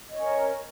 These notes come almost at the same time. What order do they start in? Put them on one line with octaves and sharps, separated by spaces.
D#5 C#5 C#4 A#4